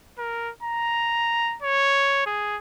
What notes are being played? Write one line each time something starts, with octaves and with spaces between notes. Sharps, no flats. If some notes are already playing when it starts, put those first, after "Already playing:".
A#4
A#5
C#5
G#4